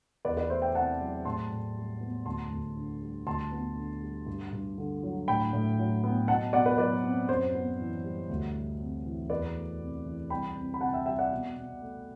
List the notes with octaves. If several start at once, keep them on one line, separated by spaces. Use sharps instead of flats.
E2 B4 D5
B4 D5
A3 C5 E5
E5 G5
C3 F#5 A5
F#3
A2 A5 C6
A2
G3
B3
D2 A5 C6
D2
D3
G3
D2 A5 C6
B3
D3
G3
G2
G2
D3
F#3
A2 G5 B5
A2
F#3
B3
B2 F#5 A5
B2 D5 F#5
B4 D5
F#3 B4 D5
C4
F#2 C5
B3
E3
G3
D2
G3
C3
E3
E2 B4 D5
A3
C3
E3
C2 G5 B5
C4
B5
C3 F#5 A5
E5 G5
G3 E5 G5
D5 F#5
B2
B2
A3